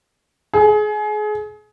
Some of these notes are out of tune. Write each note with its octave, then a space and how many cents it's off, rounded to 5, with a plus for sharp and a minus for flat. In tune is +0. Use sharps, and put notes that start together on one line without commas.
G#4 +30